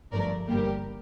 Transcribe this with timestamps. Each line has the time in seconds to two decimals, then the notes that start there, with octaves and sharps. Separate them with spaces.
0.12 G1 G2 F3 A3 A#4 D5
0.47 G1 G2 D3 G3 A#3 G4 A#4